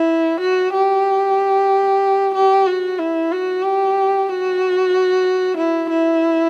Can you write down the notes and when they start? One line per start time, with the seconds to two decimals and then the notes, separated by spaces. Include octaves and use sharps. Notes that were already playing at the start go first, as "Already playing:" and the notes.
Already playing: E4
0.40 F#4
0.73 G4
2.34 G4
2.66 F#4
2.99 E4
3.32 F#4
3.64 G4
4.29 F#4
5.57 E4
5.90 E4